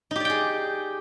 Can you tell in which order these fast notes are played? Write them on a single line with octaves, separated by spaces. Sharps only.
D#4 G4 D5 G5 G#4